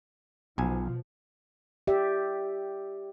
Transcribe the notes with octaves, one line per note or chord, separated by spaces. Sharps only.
B1 B2 F3 G#5
G4 D5 E5